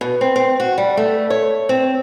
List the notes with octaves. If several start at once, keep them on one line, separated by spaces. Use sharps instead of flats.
B2
C4
C4
F#4
G3
A3
C#5
C4